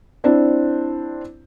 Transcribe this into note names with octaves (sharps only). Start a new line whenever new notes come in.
C4 D4 E4 C5